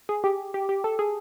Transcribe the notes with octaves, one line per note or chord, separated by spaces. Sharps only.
G#4
G4
G4
G4
A4
G#4